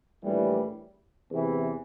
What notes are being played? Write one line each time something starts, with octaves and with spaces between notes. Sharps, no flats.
A#1 A2 E3 G3
E2 C3 E3